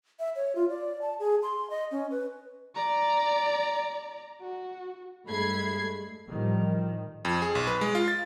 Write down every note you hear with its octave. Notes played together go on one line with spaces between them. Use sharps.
E5
C#5
F4
D5
A5
G#4
C6
D#5
C#4
B4
D5 A#5
F#4
G2 G#3 A3 B5 G#6 C7
A2 D#3 F3 G3
F2
G#4
B1
B4
G#3
F4
A6